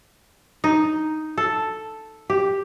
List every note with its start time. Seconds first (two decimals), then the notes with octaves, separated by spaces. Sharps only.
0.64 D#4
1.38 A4
2.30 G4